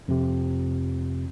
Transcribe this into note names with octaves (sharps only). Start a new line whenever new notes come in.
F2 C3